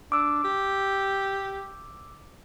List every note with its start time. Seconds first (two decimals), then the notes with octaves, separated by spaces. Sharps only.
0.12 D4 D6 E6
0.44 G4